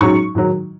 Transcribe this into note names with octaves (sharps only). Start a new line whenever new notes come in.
G#2 F#3 C#4 C#6
G#2 D#3 F#3